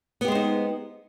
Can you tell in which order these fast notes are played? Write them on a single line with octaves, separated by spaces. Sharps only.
B3 G4 G#3 C5 D#4